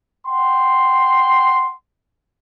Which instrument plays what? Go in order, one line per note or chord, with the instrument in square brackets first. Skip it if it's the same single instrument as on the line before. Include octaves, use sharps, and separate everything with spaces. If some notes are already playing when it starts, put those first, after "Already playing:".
[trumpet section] F#5 G5 C6